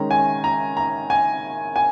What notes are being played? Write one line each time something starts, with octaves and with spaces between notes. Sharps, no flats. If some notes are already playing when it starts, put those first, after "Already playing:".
Already playing: D#3 G#3 C#4 A#5
G#5
A#5
A#5
G#5
G#5